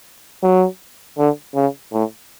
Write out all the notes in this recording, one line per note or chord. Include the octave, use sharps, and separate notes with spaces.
F#3
D3
C#3
A2